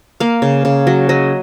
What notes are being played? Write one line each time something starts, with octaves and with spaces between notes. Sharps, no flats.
A#3 F5
C#3
C#3
F#3
F#3 D#5